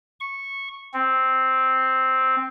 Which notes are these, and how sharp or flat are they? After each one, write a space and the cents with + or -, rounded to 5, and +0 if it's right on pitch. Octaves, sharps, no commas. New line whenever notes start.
C#6 -10
C4 +0